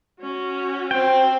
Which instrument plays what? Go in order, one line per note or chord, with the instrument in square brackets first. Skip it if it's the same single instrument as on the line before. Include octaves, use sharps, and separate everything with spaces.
[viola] C#4 F#4
[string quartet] C4 [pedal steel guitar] G5